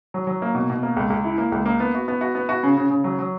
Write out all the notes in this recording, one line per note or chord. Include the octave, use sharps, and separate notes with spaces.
F#3
F#3
A#3
B2
B2
A#3
C#2
C#2
E4
A#3
C#2
A#3
B3
F#4
B3
F#4
B3
F#4
C#3
C#3
C#3
F#3
F#3